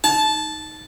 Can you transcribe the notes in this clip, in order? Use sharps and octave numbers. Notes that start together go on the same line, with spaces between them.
D#4 A5